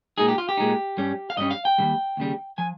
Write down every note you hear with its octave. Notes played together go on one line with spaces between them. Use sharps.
A#2 G#3 D#4 G#4
G4
F4
G4
A#2 G#3 D#4
G2 G3 C#4
F5
G2 G3 C#4 D#5
F5
G5
D#2 C#3 G3
D#2 C#3 G3
F3 G#5